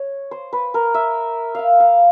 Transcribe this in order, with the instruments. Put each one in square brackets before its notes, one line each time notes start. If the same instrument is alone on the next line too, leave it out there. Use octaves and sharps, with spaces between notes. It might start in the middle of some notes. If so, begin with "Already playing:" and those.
Already playing: [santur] C#5
C5
B4
A#4
E5
E5 F5
F5